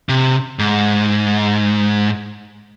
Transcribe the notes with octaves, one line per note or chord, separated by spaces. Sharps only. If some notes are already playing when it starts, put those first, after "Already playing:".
C3
G#2